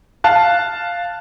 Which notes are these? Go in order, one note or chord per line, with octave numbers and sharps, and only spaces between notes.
F5 A5 F#6